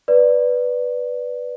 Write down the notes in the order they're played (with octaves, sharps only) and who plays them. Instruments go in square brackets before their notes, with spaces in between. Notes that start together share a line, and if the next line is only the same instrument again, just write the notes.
[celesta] B4 D5